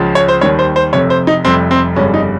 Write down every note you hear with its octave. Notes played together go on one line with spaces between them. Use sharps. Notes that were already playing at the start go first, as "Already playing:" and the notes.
Already playing: C#2 C#3 F3
C#5
C5
D#2 D#3 G3 C#5
C5
C5
F1 F2 C3 C#5
C5
D#4
F1 F2 C3 G3 C4
C4
G1 F2 C#3 G3 C#4
D#4